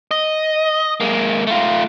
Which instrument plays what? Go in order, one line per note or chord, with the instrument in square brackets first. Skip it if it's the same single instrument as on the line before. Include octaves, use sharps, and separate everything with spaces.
[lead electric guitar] D#5
G#3 A#3
A3 F4